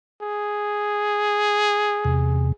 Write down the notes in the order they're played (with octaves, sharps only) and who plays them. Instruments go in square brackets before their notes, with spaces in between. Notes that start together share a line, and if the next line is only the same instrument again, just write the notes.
[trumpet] G#4
[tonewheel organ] E2 C3